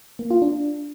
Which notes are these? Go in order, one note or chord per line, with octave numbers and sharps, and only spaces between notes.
A#3
F4
D4